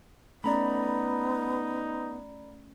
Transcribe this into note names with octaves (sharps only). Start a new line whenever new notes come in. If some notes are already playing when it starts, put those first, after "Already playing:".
A3 B3 C#4 D#4 D5 A#5 B5